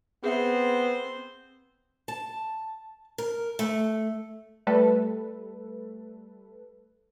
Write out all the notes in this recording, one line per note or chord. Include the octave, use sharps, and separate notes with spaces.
B3 C4 G#4 C5 E5 G5
A5
A#4
A3
G3 A3 A4 B4